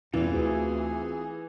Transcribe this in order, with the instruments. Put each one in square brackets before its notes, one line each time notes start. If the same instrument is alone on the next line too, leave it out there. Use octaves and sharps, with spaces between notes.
[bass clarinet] E2 [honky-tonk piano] E3 [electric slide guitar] C4 E4 F4
[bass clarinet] D2 [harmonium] G#4